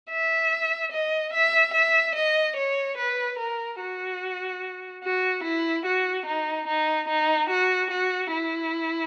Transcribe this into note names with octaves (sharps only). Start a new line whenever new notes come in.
E5
D#5
E5
E5
D#5
C#5
B4
A#4
F#4
F#4
E4
F#4
D#4
D#4
D#4
F#4
F#4
E4